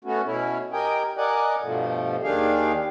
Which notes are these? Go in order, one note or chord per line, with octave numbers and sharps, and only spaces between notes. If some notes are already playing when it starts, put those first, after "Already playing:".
A3 B3 C#4 F#4
B2 C#4 E4
G4 A#4 D#5 G5 G#5
A#4 D5 D#5 F#5 G#5
G2 B2 F3 A3
D#2 D#3 D4 G4 G#4 F5